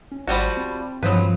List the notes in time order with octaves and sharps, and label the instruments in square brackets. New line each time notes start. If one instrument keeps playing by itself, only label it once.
[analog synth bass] C#4
[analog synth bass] G#1 [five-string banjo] F3 G3 F#4 [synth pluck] B5 A6
[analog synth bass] C4
[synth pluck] G2 C5 D#6 [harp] F3 [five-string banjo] F#3 B4